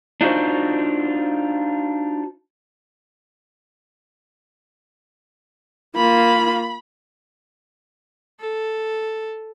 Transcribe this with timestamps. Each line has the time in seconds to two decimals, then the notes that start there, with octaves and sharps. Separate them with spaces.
0.21 D4 D#4 F4 F#4 C5
5.96 A#3 F4 B5
8.40 A4